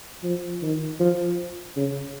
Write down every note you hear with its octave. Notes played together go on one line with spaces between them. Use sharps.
F3
D#3
F3
C#3